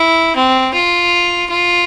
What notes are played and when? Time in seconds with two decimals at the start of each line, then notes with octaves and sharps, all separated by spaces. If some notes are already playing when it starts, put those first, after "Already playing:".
Already playing: E4
0.36 C4
0.74 F4
1.50 F4